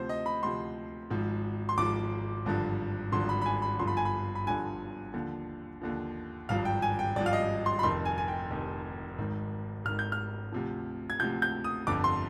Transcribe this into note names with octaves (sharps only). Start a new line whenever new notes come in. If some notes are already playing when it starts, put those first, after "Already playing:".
Already playing: D2 C3 F3 C5
D#5
B5
D2 C3 F3 C6
G#1 G#2 F3
C6
G#1 G#2 F3 D6
G#1 G2 D3 F3
G#1 G2 D3 F3 C6
B5
B5
G#5
B5
G1 G2 D3 F3 C6
B5
G#5
B5
B5
G1 G2 D3 F3 G#5
D#2 D3 F3
D#2 D3 F3
G#1 G2 F3 F5
G5
G#5
G5
G#1 G2 F3 D5
F5
D#5
C6
B5
F1 F2 D#3 C6
G#5
G#5
G5
F1 F2 D#3
G#1 G#2 D#3
G#1 G#2 D#3 F6
G6
F6
D2 C3 F3
G#6
D2 C3 F3 G6
G6
D#6
G1 F2 D3 D6
C6